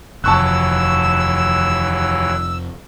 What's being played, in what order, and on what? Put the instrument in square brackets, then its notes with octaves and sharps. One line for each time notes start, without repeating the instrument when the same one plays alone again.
[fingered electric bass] F1 [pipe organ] D#2 E3 F#3 [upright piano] A5 C#6 F#6 [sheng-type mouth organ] E6